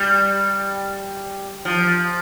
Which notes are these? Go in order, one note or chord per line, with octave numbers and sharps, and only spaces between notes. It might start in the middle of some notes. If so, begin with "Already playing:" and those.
Already playing: G3
F3